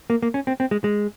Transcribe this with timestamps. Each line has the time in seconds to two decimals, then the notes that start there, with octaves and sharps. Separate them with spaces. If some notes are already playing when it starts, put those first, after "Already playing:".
0.10 A#3
0.22 A#3
0.34 C#4
0.47 C4
0.60 C4
0.71 G#3
0.84 G#3